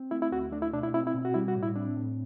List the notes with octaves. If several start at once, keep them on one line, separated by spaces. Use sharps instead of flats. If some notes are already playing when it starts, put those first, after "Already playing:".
Already playing: C4
A3 E4
E4
D2 F#4
A3 D4
E4
B2 D4
E4
C4 E4
E4
B2
F#4
G3 E4
F#4
A2
E4
C4 D4
A2